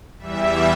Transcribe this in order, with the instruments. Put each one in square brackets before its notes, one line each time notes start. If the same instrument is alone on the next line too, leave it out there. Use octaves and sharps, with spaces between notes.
[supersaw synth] E2 E3 G3 E5